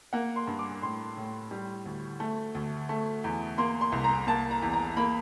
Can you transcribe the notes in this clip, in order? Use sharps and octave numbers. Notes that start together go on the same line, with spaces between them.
A#3 F#5
C6
G2
D6
A2 C6
A2
G3
D2
A3
D2
A3
E2
A#3 C6
C6
C2
A#5
A#3 A5
A#5
E2
A#5
A#3 B5